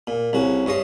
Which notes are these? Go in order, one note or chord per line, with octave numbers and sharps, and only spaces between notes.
A#2
C2 C#3 F#4
G2 C#5 D#5 C6